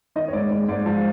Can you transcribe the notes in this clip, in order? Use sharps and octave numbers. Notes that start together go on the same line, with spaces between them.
D#3 D#5
C#5
G#2 D5
G#2 D5
G#2 D5
F3